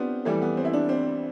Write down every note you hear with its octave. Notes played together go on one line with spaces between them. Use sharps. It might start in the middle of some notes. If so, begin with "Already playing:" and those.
Already playing: B3 C4 D4 F4 G4
F2 E3 G3 A3
B3
C4
E4
D4
C4